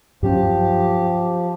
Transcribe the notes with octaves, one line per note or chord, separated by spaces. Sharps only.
G2 F3 F#3 C#4 G4